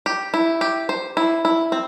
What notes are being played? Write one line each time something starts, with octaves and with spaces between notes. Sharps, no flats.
G4
E4
G4
C5
E4
E4
C4